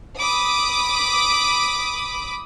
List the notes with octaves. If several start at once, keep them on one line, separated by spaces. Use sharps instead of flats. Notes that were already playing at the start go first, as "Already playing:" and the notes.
B5 D6 D#6